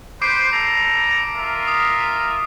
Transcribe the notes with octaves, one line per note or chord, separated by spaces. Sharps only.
B4 C5 D6 C7 D7
G3 A4 A#5
F4 A#4 E5
D#6